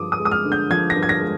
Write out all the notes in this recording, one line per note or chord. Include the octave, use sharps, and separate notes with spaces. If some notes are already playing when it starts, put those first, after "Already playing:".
Already playing: G2 D3 F3 G#3 D6 D#6
D#6
G#3
D#6
F6
D3
G6
F3 G#6
A#6
G2
G#6
A#6
G#3